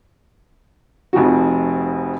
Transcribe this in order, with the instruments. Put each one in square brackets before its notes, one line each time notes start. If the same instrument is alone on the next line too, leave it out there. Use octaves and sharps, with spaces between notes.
[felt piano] F1 F2 D#4 F#4